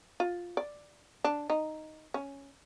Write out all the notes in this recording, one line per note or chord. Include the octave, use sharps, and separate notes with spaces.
F4
D5
D4
D#4
C#4